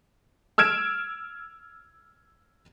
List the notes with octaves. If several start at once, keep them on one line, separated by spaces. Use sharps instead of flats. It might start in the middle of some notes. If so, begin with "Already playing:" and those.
E6 F6 G#6 D7 E7